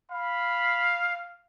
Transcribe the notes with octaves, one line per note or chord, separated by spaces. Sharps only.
F5 B5